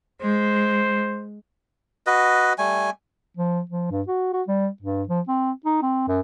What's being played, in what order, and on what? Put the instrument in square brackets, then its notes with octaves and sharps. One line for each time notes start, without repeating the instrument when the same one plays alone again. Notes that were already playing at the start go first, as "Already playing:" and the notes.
[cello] G#3 [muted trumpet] C5
[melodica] F#4 B4 D#5
G3 A3 G#5
[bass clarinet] F3
F3
G2
F#4
F#4
G3
G2
F3
C4
D#4
C4
F#2